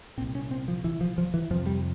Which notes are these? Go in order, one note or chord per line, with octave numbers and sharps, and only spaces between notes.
C2 A#2 C4
C#4
C4
F3
E3
F3
F3
E3
F2 C3 F3
G3